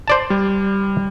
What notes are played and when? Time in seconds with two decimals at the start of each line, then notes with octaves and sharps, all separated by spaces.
0.08 C5 D5 A5
0.30 G3